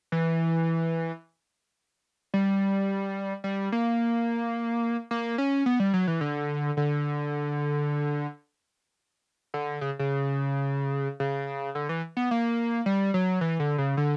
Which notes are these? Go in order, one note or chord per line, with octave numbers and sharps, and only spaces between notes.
E3
G3
G3
A#3
A#3
C#4
B3
G3
F#3
E3
D3
D3
D3
C#3
C#3
C#3
D3
E3
B3
A#3
G3
F#3
E3
D3
C#3
D3